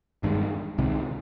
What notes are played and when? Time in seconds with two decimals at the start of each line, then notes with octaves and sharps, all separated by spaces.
0.23 G1 G2 D#3 G#3
0.78 C2 C3 D#3 G#3